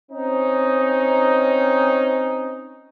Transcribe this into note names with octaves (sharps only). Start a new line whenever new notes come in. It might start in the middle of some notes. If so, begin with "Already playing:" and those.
C4 C#4 D#4